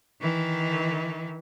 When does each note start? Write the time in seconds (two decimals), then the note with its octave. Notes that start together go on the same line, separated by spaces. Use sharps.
0.21 D#3 E3